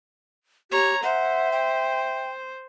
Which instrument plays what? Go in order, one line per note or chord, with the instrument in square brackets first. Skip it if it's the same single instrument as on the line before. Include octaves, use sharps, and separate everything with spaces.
[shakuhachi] G4 [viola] C#5 A#5
[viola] C5 [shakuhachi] E5 [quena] F#5
[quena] G5